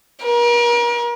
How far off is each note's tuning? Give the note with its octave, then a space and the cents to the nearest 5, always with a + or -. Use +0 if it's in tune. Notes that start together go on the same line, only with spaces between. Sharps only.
A#4 +40